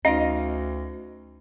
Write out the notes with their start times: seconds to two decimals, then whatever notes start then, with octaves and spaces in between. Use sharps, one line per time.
0.05 D2 C#4 D#4 D#5 F5